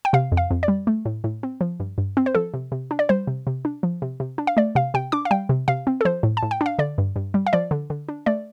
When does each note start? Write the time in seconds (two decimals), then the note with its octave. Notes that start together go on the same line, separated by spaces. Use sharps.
0.05 G5
0.13 C3 F5
0.32 F2
0.37 F5
0.51 F2
0.63 D5
0.68 G3
0.87 A3
1.05 A2
1.24 A2
1.43 C4
1.61 F3
1.80 G2
1.98 G2
2.17 C4
2.26 C5
2.35 F3 A4
2.54 C3
2.72 C3
2.91 D4
2.99 D5
3.09 G3 C5
3.27 C3
3.47 C3
3.65 D4
3.83 F3
4.02 C3
4.20 C3
4.38 D4
4.47 F5
4.57 A3 D5
4.75 C3 F5
4.94 C3 G5
5.12 D4 D6
5.25 F5
5.31 G3 G5
5.49 C3
5.68 C3 F5
5.87 C4
6.01 A4
6.05 F3 C5
6.23 A2
6.37 A5
6.43 A2
6.51 G5
6.61 D4
6.66 F5
6.79 D3 D5
6.98 G2
7.16 G2
7.34 G3
7.47 F5
7.53 F3 D5
7.71 D3
7.90 D3
8.09 D4
8.26 A3 D5